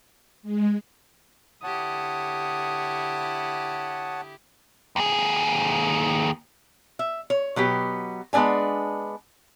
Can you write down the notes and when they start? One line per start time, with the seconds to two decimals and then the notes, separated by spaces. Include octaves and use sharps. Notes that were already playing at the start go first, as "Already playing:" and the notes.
0.43 G#3
1.63 D3 E4 G4 C#5 F#5 A5 D#6
4.96 D#2 G#4
6.99 E5
7.30 C#5
7.56 B2 F#3 B3 G4
8.33 G#3 B3 D4 D5 G#5